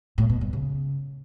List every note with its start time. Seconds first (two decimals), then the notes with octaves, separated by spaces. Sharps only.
0.18 A2
0.30 B2
0.41 G2
0.53 C#3